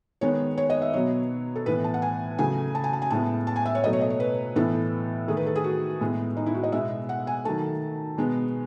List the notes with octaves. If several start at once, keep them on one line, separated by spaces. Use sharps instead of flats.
D#3 G#3 B3 C#5
C#5
D#5
E5
B2 F#3 B3 C#5
A4
A2 E3 B3 B4
A5
F#5
G#5
C#3 F#3 A3 G#5
A5
G#5
A5
G#5
A2 G#3 B3 A5
A5
G#5
E5
C#5
B2 F#3 A3 D#5
C#5
D#5
C#5
B4
A2 E3 B3 A4
D#3 A3 G#4
B4
A4
G#4
F#4
A2 G#3 B3
D#4
E4
F#4
D#5
B2 G#3 B3 E5
F#5
G#5
D#3 F#3 A3 A5
B2 G#3 B3